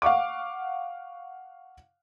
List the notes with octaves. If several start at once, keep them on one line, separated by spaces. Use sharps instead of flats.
F5 F#5 C#6 D6